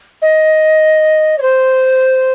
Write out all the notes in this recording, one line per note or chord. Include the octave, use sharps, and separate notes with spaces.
D#5
C#5
C5